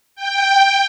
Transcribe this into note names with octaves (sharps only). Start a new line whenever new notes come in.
G5